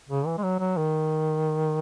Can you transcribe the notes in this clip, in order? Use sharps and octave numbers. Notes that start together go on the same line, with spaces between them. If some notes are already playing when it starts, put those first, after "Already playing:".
C#3
E3
G#3
F#3
F#3
D#3